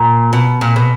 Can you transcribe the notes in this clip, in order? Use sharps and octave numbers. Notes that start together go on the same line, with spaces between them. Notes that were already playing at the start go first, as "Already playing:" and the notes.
Already playing: A#2
B2
A#2
B2